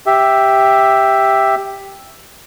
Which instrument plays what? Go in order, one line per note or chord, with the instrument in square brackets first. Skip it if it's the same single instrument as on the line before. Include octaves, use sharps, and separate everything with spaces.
[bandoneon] G4 E5